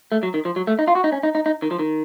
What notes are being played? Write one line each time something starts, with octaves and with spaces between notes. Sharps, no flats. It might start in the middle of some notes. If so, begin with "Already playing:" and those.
A3
F#3
D#3
F3
F#3
A3
D#4
F4
F#4
D#4
C#4
D#4
D#4
D#4
D#3
F3
D#3